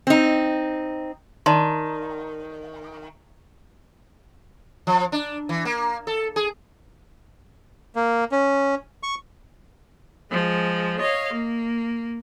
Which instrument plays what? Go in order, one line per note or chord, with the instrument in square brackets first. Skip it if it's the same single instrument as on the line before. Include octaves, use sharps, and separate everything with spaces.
[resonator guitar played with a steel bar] C4 D#4
[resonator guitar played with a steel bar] D#3 [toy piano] D5 A5 C6
[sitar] F3
D4
E3
A#3
A4
G#4
[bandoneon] A#3
C#4
C#6
[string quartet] F3 G#3
C#5 D#5 F5
A#3